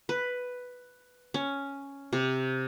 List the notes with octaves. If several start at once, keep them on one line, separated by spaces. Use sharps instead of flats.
B4
C#4
C3